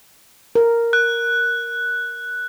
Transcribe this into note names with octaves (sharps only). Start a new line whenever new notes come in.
A#4
F#6